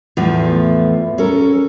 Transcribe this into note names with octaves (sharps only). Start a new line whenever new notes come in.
E2 A2 F3 A3
C#4 A4 A#4